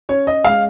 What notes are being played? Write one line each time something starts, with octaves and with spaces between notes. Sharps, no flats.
C#4 C#5
D#5
G#3 F5